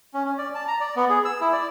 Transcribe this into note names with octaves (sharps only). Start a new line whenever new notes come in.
C#4
C#4
D5
A5
A#5
D5
B3
G#4
E6
E4
D5